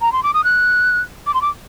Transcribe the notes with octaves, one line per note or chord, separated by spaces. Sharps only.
A#5
C6
D6
D#6
F#6
D6
C6
D6